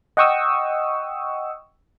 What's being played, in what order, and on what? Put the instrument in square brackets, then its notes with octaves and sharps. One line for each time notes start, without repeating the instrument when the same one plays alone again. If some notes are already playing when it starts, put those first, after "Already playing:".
[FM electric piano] D#5 F#5 G5 C#6 D#6 E6